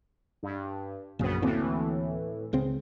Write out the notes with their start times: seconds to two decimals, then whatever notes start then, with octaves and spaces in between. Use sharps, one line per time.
0.43 G2
1.19 A#1 F#2 C#3 B3
1.42 D2 A2 E3 A#3 C4
2.53 C#2 C#3 C4